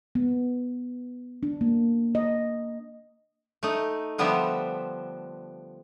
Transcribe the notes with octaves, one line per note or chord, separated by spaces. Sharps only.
B3
D4
A#3
D#5
A3 D#4
D3 F3 G3 B3 C5 E5